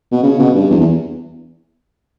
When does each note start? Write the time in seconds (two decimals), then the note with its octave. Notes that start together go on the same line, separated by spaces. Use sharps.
0.12 B2
0.23 C#3
0.39 B2
0.55 G2
0.70 E2
0.80 E2